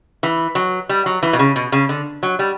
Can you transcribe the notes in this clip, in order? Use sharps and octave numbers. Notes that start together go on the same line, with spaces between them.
E3
F#3
G3
F#3
E3
B2
C#3
B2
C#3
D3
F#3
G3